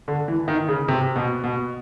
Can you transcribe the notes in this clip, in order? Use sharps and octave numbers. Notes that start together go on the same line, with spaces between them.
D3
E3
D#3
C#3
C3
B2
B2